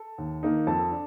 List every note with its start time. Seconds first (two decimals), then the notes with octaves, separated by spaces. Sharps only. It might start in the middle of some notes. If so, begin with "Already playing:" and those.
Already playing: A4
0.18 D#2
0.43 D#3 A#3 D#4
0.67 F2 A4 A5
0.91 D4